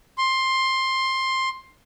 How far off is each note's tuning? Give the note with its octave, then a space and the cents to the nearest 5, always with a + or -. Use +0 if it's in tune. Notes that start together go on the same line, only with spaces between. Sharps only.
C6 +15